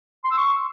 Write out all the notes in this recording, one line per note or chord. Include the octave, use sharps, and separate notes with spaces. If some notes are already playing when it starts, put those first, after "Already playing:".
C6
E6
C#6